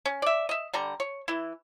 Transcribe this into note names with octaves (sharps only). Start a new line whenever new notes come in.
C#4
D5 E5
D#5 E5
D3 G3 A#5
C#5
E3 E4